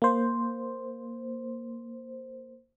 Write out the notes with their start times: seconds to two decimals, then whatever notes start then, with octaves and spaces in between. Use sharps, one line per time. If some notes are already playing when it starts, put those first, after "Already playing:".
0.02 A#3 C5